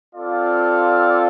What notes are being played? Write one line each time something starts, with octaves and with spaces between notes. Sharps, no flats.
C4 F4 A4 D5 F5